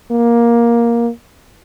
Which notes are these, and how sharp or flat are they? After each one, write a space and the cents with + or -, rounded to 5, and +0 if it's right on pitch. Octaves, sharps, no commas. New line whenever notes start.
A#3 +10